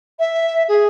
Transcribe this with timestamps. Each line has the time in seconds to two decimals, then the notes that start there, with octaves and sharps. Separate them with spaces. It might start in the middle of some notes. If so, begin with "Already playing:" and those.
0.19 E5
0.69 G#4